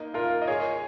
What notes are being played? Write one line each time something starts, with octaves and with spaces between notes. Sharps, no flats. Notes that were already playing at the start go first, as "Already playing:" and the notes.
Already playing: A#3 D#4
F4 A#4
D#5
G#4 C#5